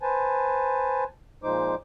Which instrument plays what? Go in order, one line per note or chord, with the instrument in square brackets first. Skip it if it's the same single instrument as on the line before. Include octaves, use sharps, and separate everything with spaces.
[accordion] B4 C5 G#5 A5
A#2 F3 G#3 D#4 C5 D6